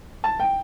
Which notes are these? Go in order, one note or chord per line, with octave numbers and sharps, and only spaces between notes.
A5
G5